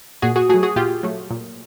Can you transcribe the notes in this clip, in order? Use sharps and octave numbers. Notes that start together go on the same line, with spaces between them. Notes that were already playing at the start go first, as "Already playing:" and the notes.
A#2 F#4 G#4
F#4 G#4
F#3 A3 F#4 G#4
F#4 G#4
A#2 F4 G4
F#3 A3
A#2